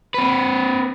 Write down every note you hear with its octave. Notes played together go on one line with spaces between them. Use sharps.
C4 B4